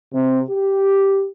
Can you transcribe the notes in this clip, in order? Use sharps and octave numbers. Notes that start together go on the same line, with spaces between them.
C3
G4